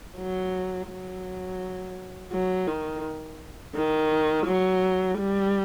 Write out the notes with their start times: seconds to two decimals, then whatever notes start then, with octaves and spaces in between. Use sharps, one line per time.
0.16 F#3
0.88 F#3
2.32 F#3
2.67 D#3
3.75 D#3
4.46 F#3
5.18 G3